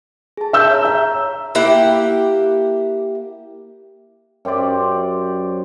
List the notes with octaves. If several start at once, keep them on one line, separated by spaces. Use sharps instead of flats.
G#4 A5
E5 E6 G6
C#5 A#5
E5
A#3 E4 G4 F#5
F#2 G4 C5 D5